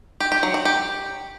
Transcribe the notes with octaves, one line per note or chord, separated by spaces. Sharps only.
G4
G4
F#3
F#4
G4